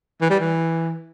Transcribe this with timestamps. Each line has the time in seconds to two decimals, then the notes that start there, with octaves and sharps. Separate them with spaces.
0.21 E3
0.30 G3
0.40 E3